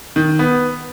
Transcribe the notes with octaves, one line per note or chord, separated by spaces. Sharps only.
D#3
B3